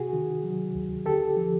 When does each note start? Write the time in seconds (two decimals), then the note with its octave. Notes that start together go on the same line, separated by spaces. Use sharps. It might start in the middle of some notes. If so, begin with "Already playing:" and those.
Already playing: C3 F#4 G#4
0.13 D#3
0.44 F#3
0.75 D2
1.06 D3 G4 A4
1.37 F3